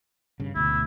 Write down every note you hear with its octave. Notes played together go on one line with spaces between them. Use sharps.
G2 C#3
D2 B2 E4